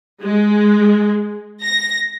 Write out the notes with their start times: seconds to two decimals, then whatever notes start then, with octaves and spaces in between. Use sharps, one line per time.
0.23 G#3
1.62 A#6